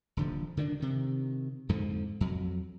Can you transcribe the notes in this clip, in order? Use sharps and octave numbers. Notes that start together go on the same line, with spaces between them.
D#1 D3 F3
D3 D#3 A3 D4
C3 D#3
F2 G#2 D3 F3
F2 F#3